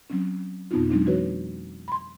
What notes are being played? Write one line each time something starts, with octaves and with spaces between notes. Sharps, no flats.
F#3 C4 C#4
F2 B2 B3 C4 D#4 F4
F#3 G#3 C4 D4 D#4
E3 F#4 B4 C#5
B5 C6